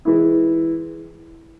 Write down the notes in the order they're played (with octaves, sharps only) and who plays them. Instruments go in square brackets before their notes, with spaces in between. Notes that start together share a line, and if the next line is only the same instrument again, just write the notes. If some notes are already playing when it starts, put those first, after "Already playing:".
[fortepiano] E3 G#3 E4